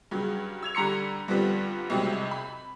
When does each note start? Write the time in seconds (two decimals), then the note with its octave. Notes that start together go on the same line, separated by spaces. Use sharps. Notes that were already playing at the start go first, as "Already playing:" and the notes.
0.11 G2 C#3 F#3
0.63 E6 G#6 F7
0.75 D3 G3 A#5 C6 C#7
1.28 G2 D3 F3 G3 B3 C4
1.90 C2 G#2 C3 F#3 C4
2.31 B5